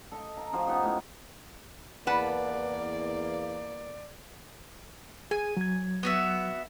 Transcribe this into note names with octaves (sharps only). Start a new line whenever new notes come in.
A4 D#5
A#5
F3 F4 F#4 G#4
B3 C#4 D#4 G4
A2
E2 A#3 B4 D5 F#5 A5
G#4 G#5
F#3 G#6
B3 F#4 E5